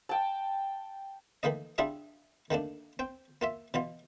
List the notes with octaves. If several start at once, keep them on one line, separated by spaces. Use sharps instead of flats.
G5 A5
D#3 E3 A3 A#3 D#5
G3 D4 E4 F4 G#4 E5
D#3 A3 A#3 D4
C4 G5
A#3 F4 E5
B2 E3 F4